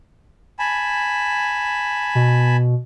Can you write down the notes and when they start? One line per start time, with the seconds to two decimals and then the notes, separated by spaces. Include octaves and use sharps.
0.59 G#5 A5 B5
2.15 B2